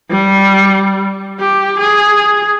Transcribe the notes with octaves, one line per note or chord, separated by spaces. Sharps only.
G3
G4
G#4